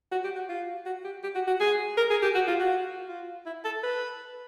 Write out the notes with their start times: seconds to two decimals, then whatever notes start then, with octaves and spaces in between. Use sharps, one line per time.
0.11 F#4
0.24 G4
0.36 F#4
0.49 F4
0.85 F#4
1.04 G4
1.23 G4
1.35 F#4
1.47 F#4
1.60 G#4
1.97 A#4
2.10 G#4
2.22 G4
2.35 F#4
2.48 F4
2.60 F#4
3.09 F4
3.46 E4
3.65 A4
3.83 B4